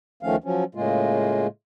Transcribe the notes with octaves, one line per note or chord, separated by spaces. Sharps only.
D2 D#3 F3 A3 C#4 F5
F3 F#3 C#4
A2 C#3 G#3 A#3 F4